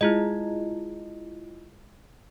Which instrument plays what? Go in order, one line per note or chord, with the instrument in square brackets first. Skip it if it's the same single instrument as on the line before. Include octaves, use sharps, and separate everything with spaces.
[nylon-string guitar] G#3 [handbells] E4 F4 D#5